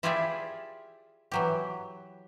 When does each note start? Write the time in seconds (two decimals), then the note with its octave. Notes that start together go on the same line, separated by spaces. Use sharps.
0.03 E4 F4 G4 G#4 D5 E5
1.32 E3 F#3 G4